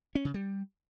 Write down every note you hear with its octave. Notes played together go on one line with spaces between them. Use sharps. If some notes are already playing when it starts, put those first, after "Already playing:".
C#4
C#3
G3